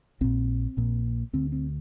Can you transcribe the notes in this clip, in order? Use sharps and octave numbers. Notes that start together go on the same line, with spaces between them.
A#1 A#2 C4
A#1 A#2
D2 D3 C4
C4